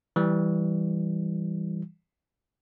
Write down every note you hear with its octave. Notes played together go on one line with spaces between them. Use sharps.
E3 G3